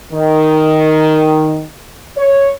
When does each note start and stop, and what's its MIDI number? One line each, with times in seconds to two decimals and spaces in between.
0.13 1.62 51
2.17 2.51 73